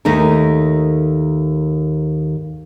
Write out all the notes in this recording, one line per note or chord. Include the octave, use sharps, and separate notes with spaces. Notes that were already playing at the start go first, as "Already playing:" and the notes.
D#2 A3 D#4 A#4